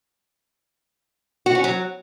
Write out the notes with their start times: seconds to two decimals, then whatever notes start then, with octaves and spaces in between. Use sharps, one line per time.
1.46 F#4
1.55 C#4
1.64 F#3